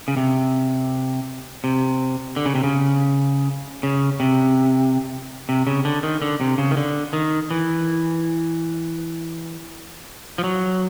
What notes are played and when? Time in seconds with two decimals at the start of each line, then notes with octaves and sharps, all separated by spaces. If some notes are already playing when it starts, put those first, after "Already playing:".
0.08 C#3
0.17 C3
1.64 C3
2.36 D3
2.46 C#3
2.55 C3
2.63 C#3
3.83 C#3
4.20 C3
5.49 C3
5.67 C#3
5.85 D3
6.03 D#3
6.22 D3
6.41 C3
6.58 C#3
6.71 D#3
6.77 D3
7.13 D#3
7.51 E3
10.38 F3
10.44 F#3